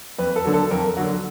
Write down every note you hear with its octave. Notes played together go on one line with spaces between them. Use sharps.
F2 B4
A4
D3 F#3
A4
F2 A#4
D3 F#3 F#4